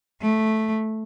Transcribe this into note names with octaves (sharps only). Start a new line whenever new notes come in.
A3